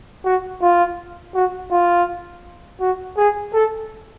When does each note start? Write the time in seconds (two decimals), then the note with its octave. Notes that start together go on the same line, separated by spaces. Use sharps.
0.25 F#4
0.62 F4
1.35 F#4
1.71 F4
2.81 F#4
3.17 G#4
3.54 A4